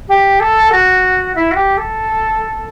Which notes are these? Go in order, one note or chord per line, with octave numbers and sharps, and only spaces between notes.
G4
A4
F#4
E4
F#4
G4
A4